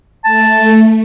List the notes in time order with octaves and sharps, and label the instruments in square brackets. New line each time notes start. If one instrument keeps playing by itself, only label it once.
[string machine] A3 [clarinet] A5